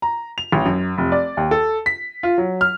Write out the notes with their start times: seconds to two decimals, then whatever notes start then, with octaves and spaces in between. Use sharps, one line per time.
0.02 A#5
0.38 F7
0.52 A1
0.65 F#2
0.98 F1
1.12 D5
1.37 D#2
1.51 A4
1.86 B6
2.23 F4
2.38 F#3
2.61 F6